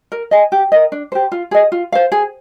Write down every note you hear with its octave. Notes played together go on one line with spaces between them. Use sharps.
A#4
D#5 G#5
G4
A#4 D#5
D4
G4 C5
F4
G#4 D#5
F4
C5 F5
G#4